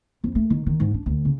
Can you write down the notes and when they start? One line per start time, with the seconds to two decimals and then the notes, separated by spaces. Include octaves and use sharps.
0.24 F2
0.35 A3
0.50 D#3
0.67 D#3
0.80 G#2
0.94 D4
1.06 D2
1.25 C#3